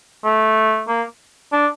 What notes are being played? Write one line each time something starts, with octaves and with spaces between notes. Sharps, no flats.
A3
A#3
D4